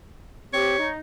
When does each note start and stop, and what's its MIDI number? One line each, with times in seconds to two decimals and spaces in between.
0.53 0.77 60
0.53 0.77 67
0.53 0.88 73
0.79 0.98 63